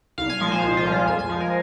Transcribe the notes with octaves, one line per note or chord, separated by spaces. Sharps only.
C2 F5
G#5
A#2 F3 G#3 F5
C5
C2
F4
A#2 F3 G#3
F4
F2 G#5
G#5
F3 G#3 F5
A#4